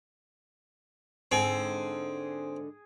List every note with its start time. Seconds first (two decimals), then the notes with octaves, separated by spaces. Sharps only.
1.32 G#2 D3 C4 G#4